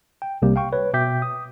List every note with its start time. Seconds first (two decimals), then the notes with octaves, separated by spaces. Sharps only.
0.22 G5
0.42 C2 C3 G3 A#3 G4
0.56 F5 G5 C#6
0.72 B4 C#5
0.94 B2 E5 G5 D6 G6 B6
1.22 D#6